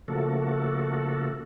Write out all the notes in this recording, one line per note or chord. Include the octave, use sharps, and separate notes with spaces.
C#3 F3 A3 A#3 F#4 A4